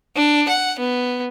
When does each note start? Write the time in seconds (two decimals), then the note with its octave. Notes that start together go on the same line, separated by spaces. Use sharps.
0.16 D4
0.49 F#5
0.80 B3